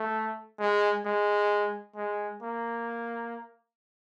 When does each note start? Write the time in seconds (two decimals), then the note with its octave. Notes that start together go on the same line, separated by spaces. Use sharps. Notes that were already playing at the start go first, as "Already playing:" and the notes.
Already playing: A3
0.59 G#3
1.05 G#3
1.96 G#3
2.42 A#3